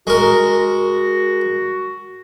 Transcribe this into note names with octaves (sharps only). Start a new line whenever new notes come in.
G#3 F#4 A#4